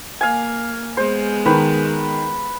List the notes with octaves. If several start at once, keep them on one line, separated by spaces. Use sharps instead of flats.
A#3 F5 G#5
G#3 B3 C5
D#3 B4